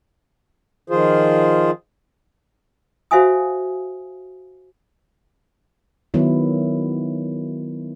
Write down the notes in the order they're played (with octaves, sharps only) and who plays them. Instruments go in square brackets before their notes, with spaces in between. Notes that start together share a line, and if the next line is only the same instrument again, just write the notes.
[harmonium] D#3 F3 F4 G#4 C5
[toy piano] F#4 C5 E5 F5 G#5 D#6
[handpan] D#3 F#3 B3 E4